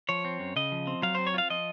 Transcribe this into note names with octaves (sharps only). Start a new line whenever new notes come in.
F3 C#5
C4
F#2
C#3 D#5
F3
C4
F#3 F5
C4 C5
C#5
F4 F5
F3 D#5